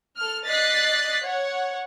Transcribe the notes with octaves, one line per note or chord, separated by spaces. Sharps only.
A4 F6
D5 D#5 F#6 A6 B6 C7
C#5 F#5